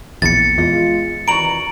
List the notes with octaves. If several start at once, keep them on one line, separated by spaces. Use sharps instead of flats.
A#1 E2 A6 C#7
E2 G#3 F4 D#5
C3 D#3 E3 F#4 D5 A#5 D7 F#7